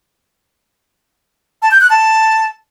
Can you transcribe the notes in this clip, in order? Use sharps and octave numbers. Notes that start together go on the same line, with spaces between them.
A5
G6
F#6
A5